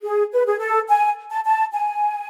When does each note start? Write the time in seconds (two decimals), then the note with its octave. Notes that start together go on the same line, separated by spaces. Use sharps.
0.04 G#4
0.33 B4
0.46 G#4
0.60 A4
0.89 G#5
1.30 A5
1.45 A5
1.73 G#5